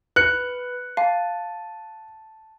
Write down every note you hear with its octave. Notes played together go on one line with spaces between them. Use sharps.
B4 F#6 C#7
F5 A5